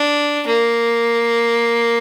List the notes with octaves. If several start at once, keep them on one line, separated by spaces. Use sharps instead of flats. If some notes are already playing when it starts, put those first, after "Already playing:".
Already playing: D4
A#3